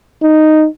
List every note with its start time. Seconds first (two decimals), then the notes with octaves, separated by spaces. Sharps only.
0.22 D#4